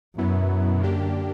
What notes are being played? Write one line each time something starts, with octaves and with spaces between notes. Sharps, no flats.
F#2 B2 F#3 B3 E4
D3 A#3 D4 G4